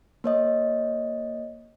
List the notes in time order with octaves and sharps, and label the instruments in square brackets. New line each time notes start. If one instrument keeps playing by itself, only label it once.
[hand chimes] A#3 C#5 D#5